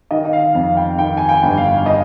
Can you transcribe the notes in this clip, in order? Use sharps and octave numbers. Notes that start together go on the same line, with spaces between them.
D#3 D#5
D#5
F5
F2 F5
G5
D#3 G5
G#5
G5
G1
F5
D#5